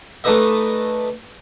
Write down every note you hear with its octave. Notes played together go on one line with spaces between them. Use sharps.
A3 D4 D#4 B4 D#5 E5